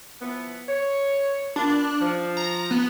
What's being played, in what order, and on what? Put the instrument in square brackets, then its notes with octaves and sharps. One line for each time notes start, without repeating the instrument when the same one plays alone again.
[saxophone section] E3 F3 B3
C#5
[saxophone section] A#3 B3 F4 [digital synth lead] D4
[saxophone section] F3
[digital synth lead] A#5
B3